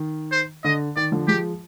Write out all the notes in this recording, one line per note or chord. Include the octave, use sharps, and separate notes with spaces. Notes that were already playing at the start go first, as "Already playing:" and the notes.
Already playing: D#3
C5
D3 D#5
D#3 D5
D3 F3
F3 G#3 G4